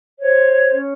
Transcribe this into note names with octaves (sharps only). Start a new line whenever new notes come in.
C5 C#5
C#4